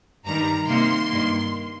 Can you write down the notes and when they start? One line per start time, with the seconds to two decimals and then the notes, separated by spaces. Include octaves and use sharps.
0.25 G2 D#3 G3 A#5
0.67 C3 D#3 A#3 C6
1.09 G2 D#3 A#3